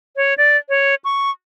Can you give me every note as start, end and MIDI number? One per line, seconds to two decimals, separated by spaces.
0.16 0.34 73
0.38 0.57 74
0.69 0.95 73
1.04 1.30 85